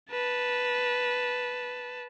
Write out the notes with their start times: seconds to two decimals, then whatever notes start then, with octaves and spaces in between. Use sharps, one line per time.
0.11 B4 A5